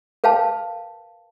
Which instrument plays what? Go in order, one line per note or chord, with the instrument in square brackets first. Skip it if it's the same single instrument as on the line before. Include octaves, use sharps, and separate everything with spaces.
[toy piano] A#4 B4 F5 G5 A5